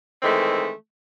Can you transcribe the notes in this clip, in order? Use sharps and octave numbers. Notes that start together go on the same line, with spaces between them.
D#3 E3 G#3 A3 C4